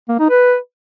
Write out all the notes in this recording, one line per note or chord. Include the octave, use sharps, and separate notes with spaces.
A#3
D#4
B4